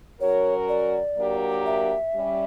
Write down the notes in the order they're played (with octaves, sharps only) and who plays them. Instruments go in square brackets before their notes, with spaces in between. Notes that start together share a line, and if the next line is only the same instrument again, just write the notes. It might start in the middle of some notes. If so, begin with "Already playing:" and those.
[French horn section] F#3 C#4 F#4 A#4 [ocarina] C#5
[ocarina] D5
[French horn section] F#3 A#3 D4 G4 A#4
[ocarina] E5
[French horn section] G3 C#4 G4